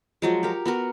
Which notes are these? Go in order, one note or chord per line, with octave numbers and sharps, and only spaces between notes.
F3 F#3 G#3
G4 A#4
B3 F#4 A#4